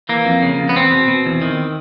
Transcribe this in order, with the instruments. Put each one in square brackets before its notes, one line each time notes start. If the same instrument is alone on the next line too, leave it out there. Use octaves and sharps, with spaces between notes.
[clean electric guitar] E3 A#3
F2
C#3
F2
B3
E2 C4
B2
B2
E2
D#3